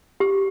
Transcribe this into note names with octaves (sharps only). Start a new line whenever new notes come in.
G4